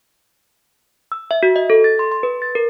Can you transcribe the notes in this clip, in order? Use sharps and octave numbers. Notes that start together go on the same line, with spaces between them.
E6
E5
F#4
D#5
A4
A6
C6
C6
B4
A6
A#4